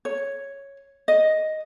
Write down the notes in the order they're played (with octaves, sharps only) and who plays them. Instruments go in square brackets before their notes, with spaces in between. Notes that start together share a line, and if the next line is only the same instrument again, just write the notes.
[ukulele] C#5
D#5